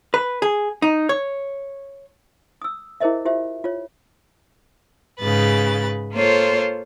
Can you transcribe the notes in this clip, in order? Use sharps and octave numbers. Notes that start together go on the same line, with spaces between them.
B4
G#4
D#4
C#5
D#6 E6
E4 G#4 A#4 C5 D#5 E5
F4 G4 C5 E5
F4 C#5
G#2 C#3 B4 A6
A#3 F4 A4 C5 C#5